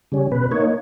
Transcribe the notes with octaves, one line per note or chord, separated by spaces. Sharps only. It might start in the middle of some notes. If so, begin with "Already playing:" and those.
C#3 G3 C#4
B2 B4
A#3 D#4 C#5